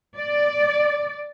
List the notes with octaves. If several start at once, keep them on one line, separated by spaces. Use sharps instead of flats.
D5